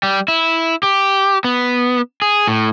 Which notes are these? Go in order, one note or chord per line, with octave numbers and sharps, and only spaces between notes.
G3
E4
G4
B3
G#4
A2